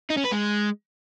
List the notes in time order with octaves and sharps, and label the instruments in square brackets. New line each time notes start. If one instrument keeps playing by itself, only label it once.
[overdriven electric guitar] D#4
C#4
B4
G#3